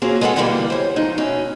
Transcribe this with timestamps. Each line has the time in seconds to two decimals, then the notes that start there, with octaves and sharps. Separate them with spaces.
0.02 A#3 C4 C#4 F4 F#4 G#4
0.21 G#3 B3 C#4 A4 F#5
0.36 B2 D3 E3 F#3 G3 A#3
0.70 C5 C#5
0.96 F3 G#3 A3 D#4
1.18 D2 B2 C#4 E5